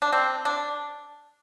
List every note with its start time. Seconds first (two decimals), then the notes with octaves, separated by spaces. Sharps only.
0.02 D4
0.12 C4
0.45 D4